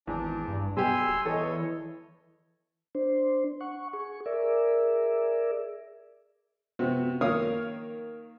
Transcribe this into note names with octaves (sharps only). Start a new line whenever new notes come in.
G#1 E2 D4
G2
B2 G3 G4 G#5 C6 E6
D1
E2 E3 A4 C#5 D#5
D4 C5
F#5 C#6
G#4 C#6
G#4 A#4 D5 E5
C3 B3 C4 F#4
D#3 A#3 A#4 C#5 F5 D#6